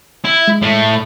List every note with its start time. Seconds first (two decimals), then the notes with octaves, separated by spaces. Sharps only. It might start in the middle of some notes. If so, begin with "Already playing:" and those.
0.24 E4
0.48 G#3
0.62 A2 A3